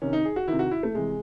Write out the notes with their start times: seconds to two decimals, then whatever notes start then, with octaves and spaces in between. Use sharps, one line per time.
0.02 C3 D#3 C#4
0.13 D#4
0.25 G#4
0.36 F#4
0.48 C3 D#3 E4
0.59 F#4
0.71 E4
0.83 A3
0.95 C3 E3 G#3